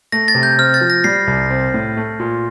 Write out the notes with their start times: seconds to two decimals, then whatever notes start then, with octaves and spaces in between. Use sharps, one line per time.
0.12 A3 A#6
0.28 A6
0.35 C3
0.43 G6
0.58 C4 F6
0.74 A6
0.81 F3
0.90 A#6
1.04 G3 C7
1.27 C2
1.50 C4
1.74 A2
1.97 A3
2.19 A#2